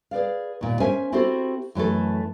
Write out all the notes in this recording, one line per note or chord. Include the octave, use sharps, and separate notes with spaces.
G#4 B4 D5 F5
D#2 A#2
C#4 A#4 C5 E5 G#5
C4 E4 F#4 G4 A4 C5
F#2 E3 A3 A4